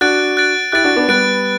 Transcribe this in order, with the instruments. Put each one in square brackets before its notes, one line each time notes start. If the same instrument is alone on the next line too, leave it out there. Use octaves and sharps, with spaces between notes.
[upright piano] D4 F#4 [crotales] F#6 A6 D7
[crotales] F#6 A6 D7
[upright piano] E4 G4 [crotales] F#6 A6 D7
[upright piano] D4 F#4
B3 D4
[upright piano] G3 B3 [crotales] F#6 A6 D7